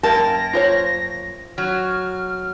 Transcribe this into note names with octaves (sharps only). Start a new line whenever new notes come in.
F#2 A#3 A#4 G5 A5 A#6
F4 C5 C#5
F#3 F6